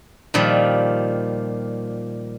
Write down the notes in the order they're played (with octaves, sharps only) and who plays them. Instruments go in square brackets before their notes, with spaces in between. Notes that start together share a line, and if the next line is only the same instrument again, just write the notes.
[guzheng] A#2 D#3 F3 G3